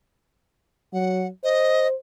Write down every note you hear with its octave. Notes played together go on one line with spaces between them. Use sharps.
F#3 F#5
C5 D#5